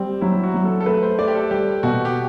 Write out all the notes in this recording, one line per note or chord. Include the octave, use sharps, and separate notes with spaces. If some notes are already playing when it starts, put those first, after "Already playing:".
Already playing: G3 C4
F#3 E4
F#4
F#3
A4
A4
A3 B4
C5
A3 D5
G4
A4
G3 G4
B2 F#4
G4